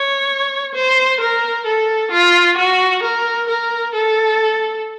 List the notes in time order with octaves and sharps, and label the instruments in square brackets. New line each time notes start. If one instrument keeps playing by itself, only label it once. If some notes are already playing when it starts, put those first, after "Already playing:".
Already playing: [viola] C#5
C5
A#4
A4
F4
F#4
A#4
A#4
A4